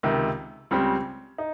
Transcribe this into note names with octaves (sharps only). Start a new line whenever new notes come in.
C#2 C3 D#3
C#2 C#3 G3 C4
D#4